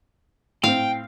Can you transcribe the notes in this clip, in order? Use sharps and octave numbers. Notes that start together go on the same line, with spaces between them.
A2 C4 F5 G5